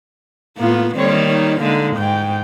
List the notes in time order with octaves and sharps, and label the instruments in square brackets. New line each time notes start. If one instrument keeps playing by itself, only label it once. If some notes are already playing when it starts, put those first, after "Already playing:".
[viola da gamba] A2 B3 [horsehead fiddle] A#3 F4
[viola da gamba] D#3 G3 A#3 [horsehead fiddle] C4 C#5
[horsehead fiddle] D#4 C#5
[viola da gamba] D3 G#3 [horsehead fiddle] A#3 D#4
[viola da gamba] G#2 [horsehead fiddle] G5